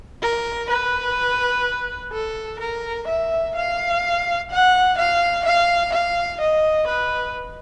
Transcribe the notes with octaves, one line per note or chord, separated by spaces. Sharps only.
A#4
B4
A4
A#4
E5
F5
F#5
F5
F5
F5
D#5
B4